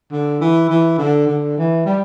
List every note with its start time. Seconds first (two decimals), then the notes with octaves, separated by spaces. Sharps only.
0.11 D3
0.41 E3
0.70 E3
0.98 D3
1.27 D3
1.58 E3
1.86 G3